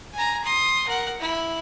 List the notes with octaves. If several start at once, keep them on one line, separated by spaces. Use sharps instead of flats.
G#5 A#5
C6 D#6
A#4 F#5
E4